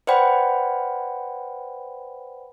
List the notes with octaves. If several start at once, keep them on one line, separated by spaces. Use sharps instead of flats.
B4 C5 D5 F#5 G5 B5